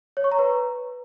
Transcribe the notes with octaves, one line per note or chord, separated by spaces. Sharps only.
C#5
C#6
A#5
B4